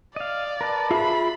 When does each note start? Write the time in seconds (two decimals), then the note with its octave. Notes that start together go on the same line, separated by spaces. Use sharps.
0.16 D5 D#5 F5
0.61 A#4 B4 A5
0.91 F4 G#4 E5 B5